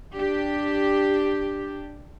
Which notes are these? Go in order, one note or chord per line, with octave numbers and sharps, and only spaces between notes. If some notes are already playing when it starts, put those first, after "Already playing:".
D4 G4